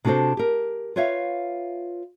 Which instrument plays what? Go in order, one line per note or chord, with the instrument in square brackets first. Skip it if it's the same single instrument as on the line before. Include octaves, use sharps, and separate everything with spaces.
[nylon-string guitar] C3 D4 F#4 G4 A4 C5
G4 A#4
F4 B4 C#5 E5 F5